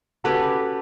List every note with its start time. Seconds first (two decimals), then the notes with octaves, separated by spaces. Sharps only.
0.24 C#4 F#4 G4 A4 B4